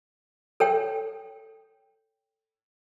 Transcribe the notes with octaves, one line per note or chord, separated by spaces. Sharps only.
A4 C#5 G5